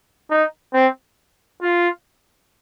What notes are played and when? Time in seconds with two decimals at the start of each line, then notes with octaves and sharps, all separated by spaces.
0.30 D#4
0.73 C4
1.62 F4